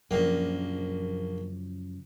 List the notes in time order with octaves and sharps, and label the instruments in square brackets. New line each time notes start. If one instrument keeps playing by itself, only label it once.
[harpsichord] A#1 A#3 [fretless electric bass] F#2 C#3 F3